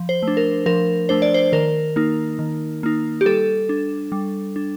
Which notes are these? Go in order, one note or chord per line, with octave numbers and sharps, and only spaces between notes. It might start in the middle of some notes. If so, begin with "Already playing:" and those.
Already playing: F3
C5
A3
D4
A#4
F3 A#4
A3 D4 C5
D5
C5
D#3 A#4
A#3 D#4
D#3
A#3 D#4
G4
G3 A4
D4
G3
D4